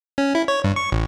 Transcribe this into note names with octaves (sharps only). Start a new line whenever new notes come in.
C#4
E4
C#5
G2
C#6
A1